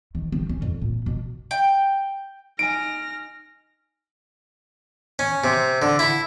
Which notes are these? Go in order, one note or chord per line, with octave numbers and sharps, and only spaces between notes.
D#3
C4
C#4
F2
A#2
B2
G5
D#4 G#5 F6 A#6 D7
C#4
C3
D3
E4